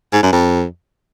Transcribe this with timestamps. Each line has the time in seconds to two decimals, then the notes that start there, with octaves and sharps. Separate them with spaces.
0.12 G#2
0.23 F#2
0.33 F2